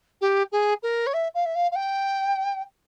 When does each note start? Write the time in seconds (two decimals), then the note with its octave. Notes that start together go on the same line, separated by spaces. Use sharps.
0.21 G4
0.52 G#4
0.82 A#4
1.06 C#5
1.13 E5
1.34 F5
1.45 E5
1.55 F5
1.71 F5
1.75 G5